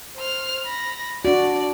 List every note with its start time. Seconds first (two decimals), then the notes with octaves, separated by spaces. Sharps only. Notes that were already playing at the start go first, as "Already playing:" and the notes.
0.16 C5 F6
0.65 B5 A#6
1.25 D4 F#4 D5